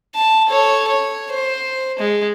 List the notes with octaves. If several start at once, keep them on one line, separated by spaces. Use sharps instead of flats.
A5
A4 C#5
C#5
C5
G#3